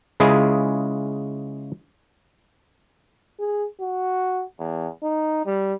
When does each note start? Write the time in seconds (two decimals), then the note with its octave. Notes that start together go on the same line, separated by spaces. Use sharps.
0.20 C#3 G#3 E4 F4 G#4
3.39 G#4
3.81 F#4
4.60 E2
5.03 D#4
5.46 G3